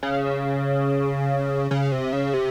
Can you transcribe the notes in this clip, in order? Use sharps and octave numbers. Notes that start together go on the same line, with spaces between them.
C#3
C#3
C3
C#3
C3